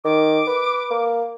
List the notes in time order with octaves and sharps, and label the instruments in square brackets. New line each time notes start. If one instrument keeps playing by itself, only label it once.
[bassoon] D#3 [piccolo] D6
[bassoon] B4
A#3